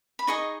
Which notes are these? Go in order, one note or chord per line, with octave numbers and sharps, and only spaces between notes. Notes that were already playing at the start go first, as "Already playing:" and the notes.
B5
D#4 G#4 D#5 C#6